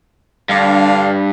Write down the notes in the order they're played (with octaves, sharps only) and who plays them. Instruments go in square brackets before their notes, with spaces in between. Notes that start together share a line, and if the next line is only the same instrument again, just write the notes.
[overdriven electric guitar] G2 [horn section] D3 D4 F5